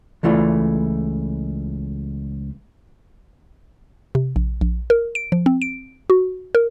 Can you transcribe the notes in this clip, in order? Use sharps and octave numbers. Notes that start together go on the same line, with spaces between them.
C#2 E3 A3 F4 D5
C3
A#1
A#1
A#4
D7
F3
C4
D7
F#4
A#4